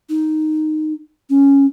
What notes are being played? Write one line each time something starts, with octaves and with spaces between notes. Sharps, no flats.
D#4
C#4